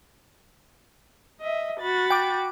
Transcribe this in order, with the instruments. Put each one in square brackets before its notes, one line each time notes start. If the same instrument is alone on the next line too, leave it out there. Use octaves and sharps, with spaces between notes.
[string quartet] D#5 E5
F#4 B5 A6
[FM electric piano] G5 D6